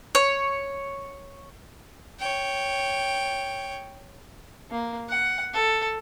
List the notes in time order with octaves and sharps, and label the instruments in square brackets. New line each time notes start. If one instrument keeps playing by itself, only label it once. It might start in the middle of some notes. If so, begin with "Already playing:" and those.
[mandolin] C#5
[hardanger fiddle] C#5 G5
A#3
F#5
A4